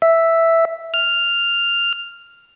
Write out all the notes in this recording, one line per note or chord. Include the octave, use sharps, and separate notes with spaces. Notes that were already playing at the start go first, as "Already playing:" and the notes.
E5
F6